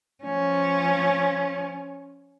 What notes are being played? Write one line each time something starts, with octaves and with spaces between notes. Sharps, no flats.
F3 C#4